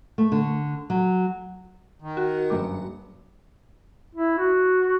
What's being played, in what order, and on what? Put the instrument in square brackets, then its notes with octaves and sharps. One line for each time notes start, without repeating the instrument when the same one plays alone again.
[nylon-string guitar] A3
D3
F#3
[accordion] D#3
[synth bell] F#4
[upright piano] F#1 G2 D6
[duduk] E4
F#4